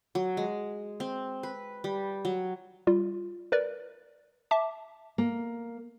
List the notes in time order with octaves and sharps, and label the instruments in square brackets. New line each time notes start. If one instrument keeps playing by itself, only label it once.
[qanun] F#3
G#3
C4
B4
G3
F#3
[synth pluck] G3 F4
A#4 B4 D5
E5 A5 D6
[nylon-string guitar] A#3